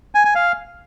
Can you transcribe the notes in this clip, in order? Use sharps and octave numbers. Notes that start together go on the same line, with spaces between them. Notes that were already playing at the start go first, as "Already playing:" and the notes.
G#5
G#5
F5